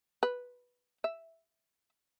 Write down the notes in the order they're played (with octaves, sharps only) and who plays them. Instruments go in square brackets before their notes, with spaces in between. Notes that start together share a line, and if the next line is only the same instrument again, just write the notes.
[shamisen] B4
E5